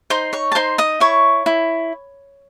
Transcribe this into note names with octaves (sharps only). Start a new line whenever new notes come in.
D#4 C5 C6
C#5 C#6
A5
D#4 C5 C6
D#5 D#6
E4 C#5 C#6
E4